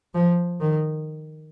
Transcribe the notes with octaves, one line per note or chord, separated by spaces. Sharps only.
F3
D#3